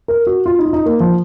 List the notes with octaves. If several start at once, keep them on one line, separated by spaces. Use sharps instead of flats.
A#4
F#4
F4
D#4
F4
D#4
A#3
F3